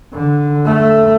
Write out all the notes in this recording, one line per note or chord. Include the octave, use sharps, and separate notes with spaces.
D3
A3